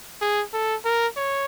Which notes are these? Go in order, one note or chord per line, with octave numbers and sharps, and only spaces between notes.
G#4
A4
A#4
C#5